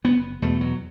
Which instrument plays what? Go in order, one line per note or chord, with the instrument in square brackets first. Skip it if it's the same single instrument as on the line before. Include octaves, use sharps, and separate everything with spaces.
[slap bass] F#1 B3
E2 B2 A3
F#3